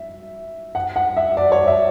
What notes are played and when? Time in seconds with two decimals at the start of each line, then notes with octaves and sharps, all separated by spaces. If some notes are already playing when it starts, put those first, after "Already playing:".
Already playing: E5
0.75 F#5
0.96 F#5
1.17 E5
1.37 D5
1.52 C#5
1.67 E5